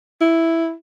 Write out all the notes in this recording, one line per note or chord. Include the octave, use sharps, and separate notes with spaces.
E4